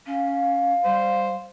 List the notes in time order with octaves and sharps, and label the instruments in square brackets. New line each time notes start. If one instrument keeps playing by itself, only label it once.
[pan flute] C#4 [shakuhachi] F5
[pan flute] G3 [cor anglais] C5